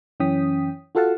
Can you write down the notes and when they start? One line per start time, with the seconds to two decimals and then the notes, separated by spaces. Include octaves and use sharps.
0.20 F#2 E3 C#4 G5 D#6 B6
0.95 F4 F#4 A4 F5 F#5 A5